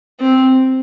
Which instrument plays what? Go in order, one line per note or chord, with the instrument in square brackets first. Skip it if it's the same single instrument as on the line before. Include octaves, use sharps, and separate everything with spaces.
[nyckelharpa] C4